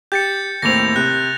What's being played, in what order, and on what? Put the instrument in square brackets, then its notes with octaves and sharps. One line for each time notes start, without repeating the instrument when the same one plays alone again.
[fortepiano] G4 [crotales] G6 A6 C#7
[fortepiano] D#2 A2 C4 [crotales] A#6 F7
[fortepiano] C3 [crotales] F#6